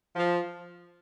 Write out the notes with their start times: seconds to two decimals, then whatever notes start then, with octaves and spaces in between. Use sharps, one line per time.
0.16 F3